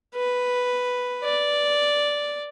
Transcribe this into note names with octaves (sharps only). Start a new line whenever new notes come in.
B4
D5